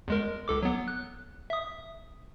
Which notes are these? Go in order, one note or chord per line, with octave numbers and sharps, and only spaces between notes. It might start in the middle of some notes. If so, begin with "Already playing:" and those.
E2 G#3 A#4
C#2 A4 D6
F#3 B3
F#6
E5 D#6